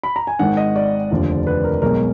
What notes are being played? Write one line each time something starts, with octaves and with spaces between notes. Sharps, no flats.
B5
A#5
G#5
G#1 G#2 D#3 F#5
D#5
D5
F1 D#2 D3 F3
B4
A#4
B1 B2 G#3 A#4